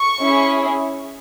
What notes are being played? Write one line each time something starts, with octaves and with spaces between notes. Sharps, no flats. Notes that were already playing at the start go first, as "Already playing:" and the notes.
Already playing: C#6
C#4 E4 G#4